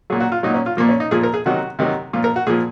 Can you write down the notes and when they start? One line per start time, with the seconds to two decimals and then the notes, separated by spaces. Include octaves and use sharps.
0.10 A#2 F#3 G#4
0.20 F#4
0.32 F4
0.43 A#2 F#3 D#4
0.54 C#4
0.66 F4
0.77 A#2 F3 A#3
0.89 C#4
1.00 D#4
1.11 A#2 F3 G#4
1.23 A#4
1.34 G#4
1.46 C3 D#3 F#3 F#4
1.79 C3 D#3 F#3
2.13 A#2 F3 F4
2.24 A#4
2.36 F#4
2.47 A#2 F3 G#4